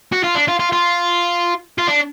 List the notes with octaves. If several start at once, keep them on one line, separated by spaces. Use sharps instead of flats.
F#4
F4
D4
F4
F4
F4
F4
D4